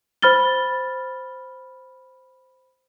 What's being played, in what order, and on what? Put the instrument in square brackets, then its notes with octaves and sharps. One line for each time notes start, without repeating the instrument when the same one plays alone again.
[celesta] C5 B5 F6 A6 G7